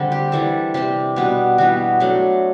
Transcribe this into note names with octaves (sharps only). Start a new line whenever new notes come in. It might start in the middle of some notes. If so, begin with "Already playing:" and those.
Already playing: D3 G3 C4
G4
E3 G3 D4 A4
C3 G3 C4 G4
B2 G3 B3 D4
E3 G3 B3 F#4
F#3 A3 D4